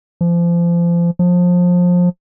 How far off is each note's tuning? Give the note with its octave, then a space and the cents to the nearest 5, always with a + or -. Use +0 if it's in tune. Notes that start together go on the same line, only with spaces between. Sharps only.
F3 -30
F3 +25